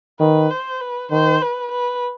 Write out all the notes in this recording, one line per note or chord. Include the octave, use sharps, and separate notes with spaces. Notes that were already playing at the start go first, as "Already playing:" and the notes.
D#3 B4
C5
B4
D#3 C5
B4
B4